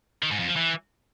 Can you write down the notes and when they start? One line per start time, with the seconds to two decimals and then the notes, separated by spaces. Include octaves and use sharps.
0.23 D#3
0.31 G#2
0.39 F2
0.48 F3
0.56 E3